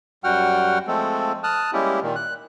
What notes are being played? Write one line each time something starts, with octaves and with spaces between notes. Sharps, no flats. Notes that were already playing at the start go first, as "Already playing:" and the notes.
F#2 G3 F#4 F#5 G5 F6
F3 G#3 A3 C4 A4
A5 D#6 F6 F#6
G3 G#3 A#3 C#4 E4 G4
A#2 D#3
F#6